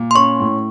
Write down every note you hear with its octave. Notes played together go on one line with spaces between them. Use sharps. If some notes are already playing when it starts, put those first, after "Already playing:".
Already playing: A#2
C6
C#4 C#6
A2